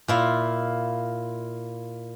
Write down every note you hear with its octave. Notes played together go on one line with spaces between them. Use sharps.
A#2 E4 F4